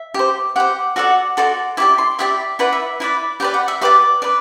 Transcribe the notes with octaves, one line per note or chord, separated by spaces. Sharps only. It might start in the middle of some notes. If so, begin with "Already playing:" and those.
Already playing: E5
G4 C5
G4 C5 F#5
F#4 A4 D5 F#5
F#4 A4 D5 C6
E4 G4 D5 D6
C6
E4 G4 D5 E5
E4 B4 D5 F#5
E5
E4 B4 D5
G4 B4 D5 G5
F#5
E5
G4 B4 D5 D6
B4 D5